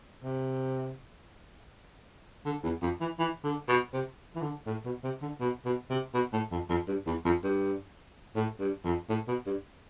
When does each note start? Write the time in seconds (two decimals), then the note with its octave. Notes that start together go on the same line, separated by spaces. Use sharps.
0.24 C3
2.46 D3
2.63 E2
2.82 F2
3.01 E3
3.19 E3
3.44 D3
3.68 B2
3.93 C3
4.35 E3
4.42 D3
4.67 A2
4.85 B2
5.04 C3
5.22 D3
5.40 B2
5.65 B2
5.90 C3
6.14 B2
6.33 A2
6.51 F2
6.69 F2
6.88 G2
7.07 E2
7.25 F2
7.44 G2
8.35 A2
8.60 G2
8.84 F2
9.09 A2
9.28 B2
9.46 G2